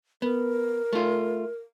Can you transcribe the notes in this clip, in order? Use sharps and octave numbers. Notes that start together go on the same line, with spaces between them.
B3 A#4
A3 F4